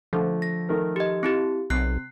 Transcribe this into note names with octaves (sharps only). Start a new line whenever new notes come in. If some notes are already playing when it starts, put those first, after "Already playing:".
D3 F3 A3
A#6
D#3 A3 A#4
G4 D#5
C4 E4 G4
B1 C3 F#6 C7